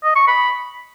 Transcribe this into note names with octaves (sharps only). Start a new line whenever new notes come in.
D#5
C#6
B5